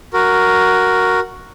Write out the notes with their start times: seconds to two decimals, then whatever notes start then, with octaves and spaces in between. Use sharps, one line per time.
0.13 F#4 A#4